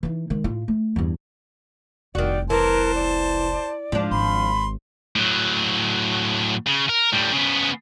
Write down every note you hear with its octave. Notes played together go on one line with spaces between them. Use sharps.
E3 D#4
D#3 G#3
A2 F4
A3
E2 G2
F1 C2 D#3 F#4 D5
E3 A#4 C5 A5
D5
G#2 F3 D4
G#1 B5 C6
A2 F#3
C#3
A#4
A2 G3
C#3 B3